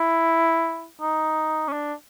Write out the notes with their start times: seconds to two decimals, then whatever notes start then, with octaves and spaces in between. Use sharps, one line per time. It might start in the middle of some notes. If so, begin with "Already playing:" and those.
Already playing: E4
1.01 D#4
1.68 C#4
1.72 D4